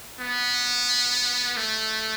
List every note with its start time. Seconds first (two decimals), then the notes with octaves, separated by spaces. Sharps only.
0.20 B3
1.57 A3